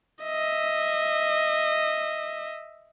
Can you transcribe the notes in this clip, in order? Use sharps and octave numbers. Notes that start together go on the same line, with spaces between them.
D#5 E5